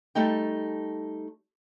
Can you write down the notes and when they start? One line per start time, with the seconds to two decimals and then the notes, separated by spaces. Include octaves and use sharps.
0.15 G3 A3 D#4 G5